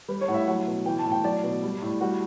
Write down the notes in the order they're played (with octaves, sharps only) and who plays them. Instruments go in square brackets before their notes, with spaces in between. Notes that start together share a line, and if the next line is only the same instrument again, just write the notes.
[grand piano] G3 B4
C#5
A2 F#5
E5
F#3 F#5
B2
E3 G5
A5
A2
G5
F#3 D5
B2
G3
A2
G3 F#4